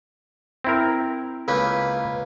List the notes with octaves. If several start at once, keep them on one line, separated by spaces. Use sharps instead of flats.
C4 E4 A#4
C#2 A#3 C#4 B4